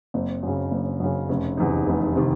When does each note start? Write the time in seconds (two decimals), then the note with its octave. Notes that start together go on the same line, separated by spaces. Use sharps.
0.14 F#1 C4
0.43 F#2 C#3
0.71 F#1
1.00 F#2 C#3
1.29 F1 C#4
1.57 E2 C3 D#3 D#4
1.86 F1
2.16 C3 D#3